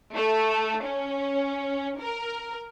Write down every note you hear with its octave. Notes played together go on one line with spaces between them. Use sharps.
A3
C#4
A#4